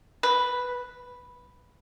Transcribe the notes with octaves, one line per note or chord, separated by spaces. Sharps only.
B4